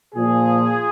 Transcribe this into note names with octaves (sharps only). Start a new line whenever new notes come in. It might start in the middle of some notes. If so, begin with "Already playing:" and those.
A#2 F3 F4 G#4